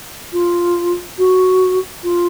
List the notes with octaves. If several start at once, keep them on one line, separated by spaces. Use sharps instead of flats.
F4
F#4
F4